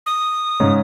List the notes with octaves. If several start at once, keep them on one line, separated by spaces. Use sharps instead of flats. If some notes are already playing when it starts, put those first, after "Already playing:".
D#6
G#2 C#3 G#3